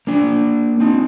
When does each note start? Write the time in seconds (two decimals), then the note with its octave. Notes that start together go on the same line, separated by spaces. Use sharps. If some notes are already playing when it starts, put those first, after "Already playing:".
0.07 A#3 D4
0.80 C4 D#4